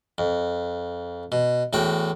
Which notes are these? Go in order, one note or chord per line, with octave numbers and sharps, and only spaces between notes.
F2
B2
E2 A2 F#4 G5